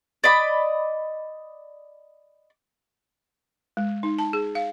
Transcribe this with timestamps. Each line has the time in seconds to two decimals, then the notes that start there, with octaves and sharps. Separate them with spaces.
0.24 D5 D#5 B5 D6
3.77 G#3
4.03 D#4
4.19 A5
4.33 G#4
4.55 F5